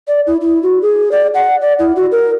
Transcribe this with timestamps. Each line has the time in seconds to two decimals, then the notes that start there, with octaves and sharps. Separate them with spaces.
0.08 D5
0.27 E4
0.41 E4
0.63 F#4
0.82 G#4
1.11 D5
1.34 F#5
1.61 D5
1.79 E4
1.96 F#4
2.12 A#4